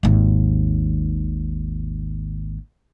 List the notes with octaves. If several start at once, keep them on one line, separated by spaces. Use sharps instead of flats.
G#1 D#2